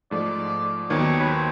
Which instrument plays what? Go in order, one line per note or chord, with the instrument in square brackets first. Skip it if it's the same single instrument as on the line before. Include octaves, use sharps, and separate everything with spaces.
[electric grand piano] G#2 F3 A3 [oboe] D5
[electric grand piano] D#2 D#3 F#3 B3 [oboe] C#5
[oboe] B4
C5